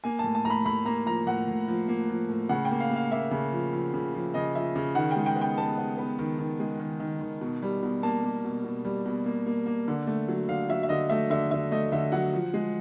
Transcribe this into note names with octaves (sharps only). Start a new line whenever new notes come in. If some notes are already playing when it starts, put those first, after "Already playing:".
A#3 G#5
A2 A5
A5
A2 A#5
B5
A2 B5
A#3 A#5
F3 A#5
A2 F#5
A2
F3
A#3
F3
A2
C#3 F#5
G5
A#3
F5
A#3
F5
A#3 E5
C#3
F3
F3
C#3
F3
C#3 D#5
F3 E5
C#3
D#3 F#5
G5
G#3
G5
B3
G5
B3 A5
B3
B3
D#3
D#3
G#3
D#3
D#3
D#3
B2
G3
B2
A#3 A5
A#3
B2
B2
G3
B2
A#3
A#3
A#3
D3
A3
F#3
D3 F5
F#3 E5
E5
D3 D#5
A3 E5
D3 E5
D3 E5
A3 D#5
D3 E5
F#3 F#5
F3
G#3